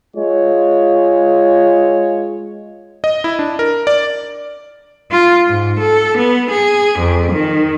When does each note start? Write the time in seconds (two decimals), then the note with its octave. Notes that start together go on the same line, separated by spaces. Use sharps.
0.16 G#3 F4 C#5
3.04 D#5
3.24 E4
3.39 D4
3.59 A#4
3.87 D5
5.11 F4
5.47 G#2
5.79 A4
6.18 B3
6.51 G#4
6.99 F2
7.32 D#3